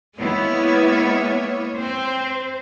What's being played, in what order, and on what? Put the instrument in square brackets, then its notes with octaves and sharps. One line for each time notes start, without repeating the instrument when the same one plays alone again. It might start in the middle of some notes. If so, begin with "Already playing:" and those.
[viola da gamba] G#3 A#3 C#5 [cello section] B3 E4
[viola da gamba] C4 [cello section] C5